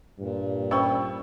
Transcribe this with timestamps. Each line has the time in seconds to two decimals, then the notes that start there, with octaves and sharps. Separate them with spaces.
0.19 G2 A#2
0.71 C#4 C5 G5 B5 C#6 E6